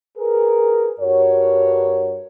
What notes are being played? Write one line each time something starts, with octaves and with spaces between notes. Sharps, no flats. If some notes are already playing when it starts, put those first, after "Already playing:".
G#4 A#4 B4
G2 F#4 A#4 C#5